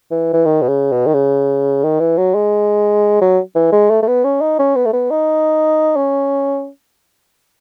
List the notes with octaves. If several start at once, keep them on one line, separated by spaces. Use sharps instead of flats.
E3
E3
D#3
B2
C#3
B2
D#3
C#3
D#3
E3
F#3
G#3
F#3
E3
G#3
A3
A3
B3
C#4
D#4
C#4
B3
A3
B3
D#4
C#4